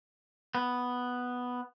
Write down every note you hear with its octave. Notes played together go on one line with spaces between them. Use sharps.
B3